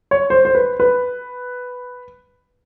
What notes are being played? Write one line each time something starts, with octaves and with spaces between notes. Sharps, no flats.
C#5
C5
C5
B4
B4